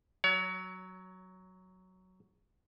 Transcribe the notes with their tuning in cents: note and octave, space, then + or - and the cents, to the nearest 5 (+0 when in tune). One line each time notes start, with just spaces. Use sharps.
F#3 +5 C#5 +30